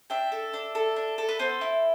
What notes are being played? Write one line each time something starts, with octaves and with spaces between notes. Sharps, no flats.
D4 E5 G5
A4
D4
A4
D4
A4
B4
B3 A4 C5
E4